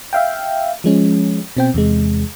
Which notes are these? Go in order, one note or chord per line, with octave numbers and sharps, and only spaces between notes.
E5 F5 G5
F3 G#3 C#4
B2 C4 G5
E2 C3 G#3